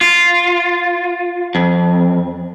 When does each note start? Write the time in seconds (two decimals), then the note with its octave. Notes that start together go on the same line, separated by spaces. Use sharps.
0.01 F4
1.55 F2